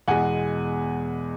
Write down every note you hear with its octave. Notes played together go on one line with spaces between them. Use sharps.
E2 B2 G#3 F#5 G#5